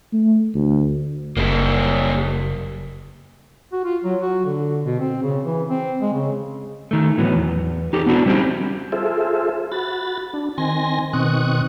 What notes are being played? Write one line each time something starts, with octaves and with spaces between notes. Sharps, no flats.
A3
D2
F#1 G3 A#3
F#4
F4
F#3
F#4
D3
B2
C4
C#3
E3
C4
G#3
C#3
D#3 A3
A2 E3 F#3 B3
E2
D#4 G4 A4
B3 C4 D4 E4 F#4
G3 A3 C4 C#4 D#4 G4
F4 G#4 A4 C5 E5
F#4 B5 A6
D4
D#3 C4 G#5 C6 A#6
B2 D#3 C4 C#6 D#6 F#6